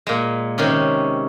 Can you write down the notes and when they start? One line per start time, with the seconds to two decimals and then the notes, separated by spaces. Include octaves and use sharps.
0.07 A#2 G#3
0.58 C3 D#3 C#4 G#4